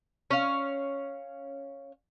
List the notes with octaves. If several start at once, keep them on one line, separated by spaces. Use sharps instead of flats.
C#4 F5